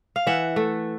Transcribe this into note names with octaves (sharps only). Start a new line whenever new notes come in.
F5
E3 E5 F#5
A3